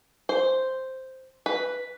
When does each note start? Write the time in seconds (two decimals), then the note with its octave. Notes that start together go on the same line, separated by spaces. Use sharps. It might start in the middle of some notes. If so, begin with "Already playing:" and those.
0.29 C5
1.46 B4